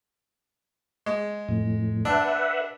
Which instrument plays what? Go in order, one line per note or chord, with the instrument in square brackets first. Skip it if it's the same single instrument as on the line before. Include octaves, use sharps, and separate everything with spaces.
[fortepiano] G#3
[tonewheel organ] F2 A2
[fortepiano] D4 [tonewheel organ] B4 E5 F#5